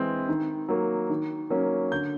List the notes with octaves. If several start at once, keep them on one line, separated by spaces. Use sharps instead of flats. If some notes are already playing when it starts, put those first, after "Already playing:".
Already playing: E3 G#3 C4
D#3
F#3 A#3
D#3
F#3 A#3 C#4
D3 G6